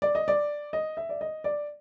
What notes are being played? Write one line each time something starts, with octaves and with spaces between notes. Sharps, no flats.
D5
D#5
D5
D#5
E5
D5
D#5
D5